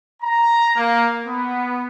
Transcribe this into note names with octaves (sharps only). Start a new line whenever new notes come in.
A#5
A#3
B3